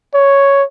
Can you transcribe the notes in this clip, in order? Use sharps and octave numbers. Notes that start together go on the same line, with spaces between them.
C#5